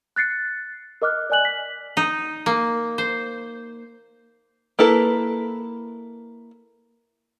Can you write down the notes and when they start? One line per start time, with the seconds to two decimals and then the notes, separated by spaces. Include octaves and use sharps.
0.16 F#6 A6 C7 C#7
1.02 A#4 D#5 D6 F6 F#6
1.30 D5 D#5 G#5 F#6 F#7
1.45 B6
1.97 D#4
2.46 A#3
2.98 C5
4.79 A#3 E4 A4 B4